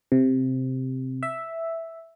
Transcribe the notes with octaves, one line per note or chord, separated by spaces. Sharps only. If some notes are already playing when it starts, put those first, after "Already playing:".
C3
E5